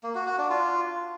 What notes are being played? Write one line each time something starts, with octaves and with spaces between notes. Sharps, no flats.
A#3
F#4
F#4
D4
F4